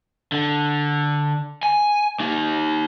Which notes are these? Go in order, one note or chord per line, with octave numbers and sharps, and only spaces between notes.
D3
G#5
A#3 D#4